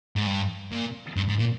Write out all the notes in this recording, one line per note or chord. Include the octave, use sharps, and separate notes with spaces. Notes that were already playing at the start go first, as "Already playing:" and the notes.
G#2
G2
A#2
G2
G#2
A#2